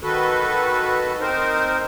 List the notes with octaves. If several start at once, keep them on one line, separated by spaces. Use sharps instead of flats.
D#3 F#4 A4 B4
C4 D#4 A#4 C5